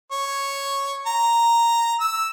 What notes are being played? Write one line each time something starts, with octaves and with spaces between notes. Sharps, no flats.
C#5
A#5
E6